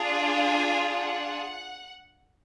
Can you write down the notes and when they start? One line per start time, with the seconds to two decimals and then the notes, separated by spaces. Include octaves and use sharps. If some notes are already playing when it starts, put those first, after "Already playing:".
Already playing: D4 F4 G#4
0.47 G#5
0.93 F#5